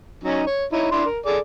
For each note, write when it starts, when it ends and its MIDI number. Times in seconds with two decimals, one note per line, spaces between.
0.23 0.42 54
0.23 0.42 61
0.23 0.42 63
0.47 0.65 73
0.72 0.89 63
0.72 0.89 64
0.72 0.89 73
0.91 1.05 62
0.91 1.05 64
0.91 1.05 84
1.06 1.19 70
1.26 1.38 68
1.26 1.38 69
1.26 1.38 74